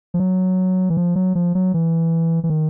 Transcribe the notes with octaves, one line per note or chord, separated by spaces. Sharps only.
F3
F#3
E3
F3
F#3
F3
F#3
E3
E3
D#3